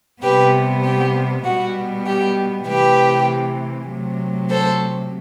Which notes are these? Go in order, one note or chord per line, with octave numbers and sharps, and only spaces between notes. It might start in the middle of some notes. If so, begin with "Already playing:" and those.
C3 G3 B3 G4 B4
G4
B2 G3 B3 F#4
G4
C3 E3 A3 G4 B4
C3 F#3 A3
A4 C5